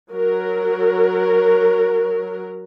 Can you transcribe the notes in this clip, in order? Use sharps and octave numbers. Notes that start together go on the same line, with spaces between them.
F#3 A#4